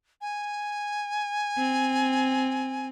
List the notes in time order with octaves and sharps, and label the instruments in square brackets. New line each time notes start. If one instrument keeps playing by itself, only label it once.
[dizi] G#5
[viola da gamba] C4